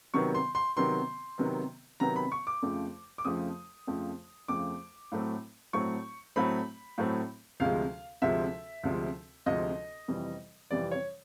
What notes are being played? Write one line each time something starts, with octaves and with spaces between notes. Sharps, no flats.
C3 D#3 F#3 B3 C#6
C6
C6
C3 D#3 F#3 B3 C6
C3 D#3 F#3 B3
C3 D#3 F#3 B3 A#5
B5
C#6
D6
F2 C#3 F3 A3
D6
F2 C#3 F3 A3 D#6
F2 C#3 F3 A3
F2 C#3 F3 A3 D6
A2 F#3 A3 C4
A2 F#3 A3 C4 C#6
A2 F#3 A3 C4 B5
A2 F#3 A3 C4
D2 C3 F3 G#3 F5
D2 C3 F3 G#3 E5
D2 C3 F3 G#3
D2 C3 F3 G#3 D#5
F2 C3 E3 G3
F2 C3 E3 G3 D5
C#5